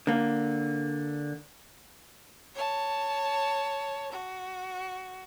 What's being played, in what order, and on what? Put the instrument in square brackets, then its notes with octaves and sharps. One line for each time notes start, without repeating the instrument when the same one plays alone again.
[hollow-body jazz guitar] D3 A#3
[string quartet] C#5 A5
F#4